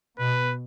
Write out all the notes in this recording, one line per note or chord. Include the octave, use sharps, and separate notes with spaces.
B2 B4